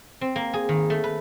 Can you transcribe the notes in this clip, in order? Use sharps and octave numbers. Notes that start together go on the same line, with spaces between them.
C4
A#3
G#4
D#3
A3
B4